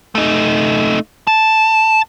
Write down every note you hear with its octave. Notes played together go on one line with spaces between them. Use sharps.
A3 D#4
A5